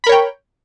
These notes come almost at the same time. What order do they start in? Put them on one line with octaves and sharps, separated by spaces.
B5 A#4 C#5 G5